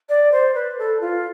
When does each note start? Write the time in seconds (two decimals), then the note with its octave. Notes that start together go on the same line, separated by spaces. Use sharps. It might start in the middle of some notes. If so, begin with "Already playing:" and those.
0.09 D5
0.32 C5
0.54 B4
0.79 A4
1.01 F4